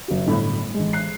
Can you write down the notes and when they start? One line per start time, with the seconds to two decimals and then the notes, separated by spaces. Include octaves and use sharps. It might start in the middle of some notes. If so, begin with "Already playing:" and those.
0.08 F#1 F#4
0.27 G1 A2 B5
0.74 A1 G#3
0.93 F#6 C7